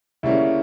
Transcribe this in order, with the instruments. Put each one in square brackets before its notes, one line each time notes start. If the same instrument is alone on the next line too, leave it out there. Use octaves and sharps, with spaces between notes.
[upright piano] D2 C#3 G3 A#3 C#4 [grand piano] E4